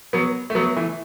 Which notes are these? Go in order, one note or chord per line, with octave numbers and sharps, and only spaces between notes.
F#3 B3
A3
F#3 B3
E3 A3